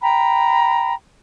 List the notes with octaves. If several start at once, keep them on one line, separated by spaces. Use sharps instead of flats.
G5 A#5 B5